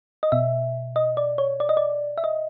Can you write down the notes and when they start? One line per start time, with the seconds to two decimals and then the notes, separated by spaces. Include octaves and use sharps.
0.23 D#5
0.32 B2 E5
0.96 D#5
1.17 D5
1.38 C#5
1.60 D5
1.69 D#5
1.77 D5
2.18 E5
2.24 D#5